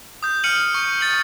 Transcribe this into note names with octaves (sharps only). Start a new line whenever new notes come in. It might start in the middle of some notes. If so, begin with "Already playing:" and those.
D#6 G6
F6 C#7 D#7 F#7
C#6
A6 C#7 F#7